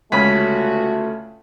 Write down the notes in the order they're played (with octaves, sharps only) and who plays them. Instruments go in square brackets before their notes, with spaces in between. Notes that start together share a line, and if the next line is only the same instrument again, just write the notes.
[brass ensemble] G1 F#4 [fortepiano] C#2 C#4 [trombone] A3 [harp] B5